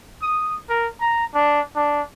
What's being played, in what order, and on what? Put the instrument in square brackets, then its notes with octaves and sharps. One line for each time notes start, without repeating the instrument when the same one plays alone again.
[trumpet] D#6
A#4
A#5
D4
D4